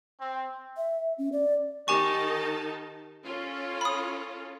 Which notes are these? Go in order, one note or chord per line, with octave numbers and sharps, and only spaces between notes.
C4
E5
C#4
D5
D#3 D#4 G4 G#5 A5 C#6
C#4 F4 A4
B5 D#6